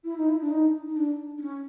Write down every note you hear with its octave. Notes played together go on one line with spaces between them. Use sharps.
E4
D#4
E4
D4
D#4
D#4
D4
D4
C#4